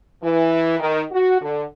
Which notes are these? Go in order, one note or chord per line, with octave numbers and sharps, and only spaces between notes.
E3
D#3
F#4
D3